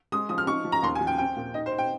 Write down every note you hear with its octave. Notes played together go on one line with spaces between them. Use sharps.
G#3 D#6
F3 D#6
F6
D#4 C#6
F3
A#5
D#2 C6
G#5
F3
G5
C4 G5
A#2
D#4 D#5
C5
D#4
G5